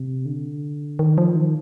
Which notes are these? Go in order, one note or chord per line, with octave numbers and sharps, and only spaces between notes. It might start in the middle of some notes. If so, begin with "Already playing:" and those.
Already playing: C3
D3
D#3
F3
D#3